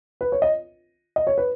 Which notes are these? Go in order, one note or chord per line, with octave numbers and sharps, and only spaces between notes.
B4
C#5
D#5
D#5
C#5
B4